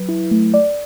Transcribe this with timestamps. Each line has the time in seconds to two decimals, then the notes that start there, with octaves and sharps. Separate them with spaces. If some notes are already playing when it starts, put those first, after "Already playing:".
Already playing: F#3 B4
0.09 E4
0.31 A3
0.54 D5